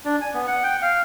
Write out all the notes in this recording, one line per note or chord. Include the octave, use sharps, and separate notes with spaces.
D4
G#5
B3
F#5
G5
F5